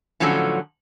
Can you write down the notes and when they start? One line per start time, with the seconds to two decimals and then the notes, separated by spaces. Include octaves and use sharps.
0.20 A2 D3 F3 F#3 C#4 A4